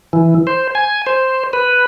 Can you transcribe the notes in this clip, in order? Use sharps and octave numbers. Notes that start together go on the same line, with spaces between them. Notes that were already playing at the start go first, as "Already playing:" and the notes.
E3
C5
G#5
C5
B4